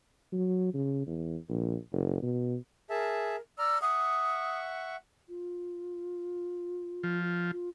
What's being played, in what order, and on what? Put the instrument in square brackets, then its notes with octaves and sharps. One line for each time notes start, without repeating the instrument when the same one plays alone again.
[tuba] F#3
C#3
E2
A#1
F#1
B2
[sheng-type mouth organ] G#4 E5 A5 [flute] A#4
[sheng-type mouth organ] D5 A#5 F6 [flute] E6
[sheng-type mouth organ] E5 F#5 C#6 [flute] D#6
[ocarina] F4
[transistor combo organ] F3
[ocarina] F4